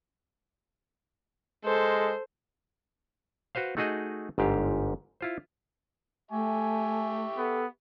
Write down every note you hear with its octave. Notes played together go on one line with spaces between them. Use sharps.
G#3 A4 C5
F#4 B4 C5 F5
A3 D#4 F#4 G#4 D#5
G1 G#2 G4 F5
E4 F4 C5
A3 G4 E5 G#5 C#6
B3 A4